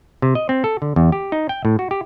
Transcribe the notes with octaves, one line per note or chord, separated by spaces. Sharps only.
C3
D#5
C4
A4
D3
E2
G4
D#4
G5
A2
F#4
G4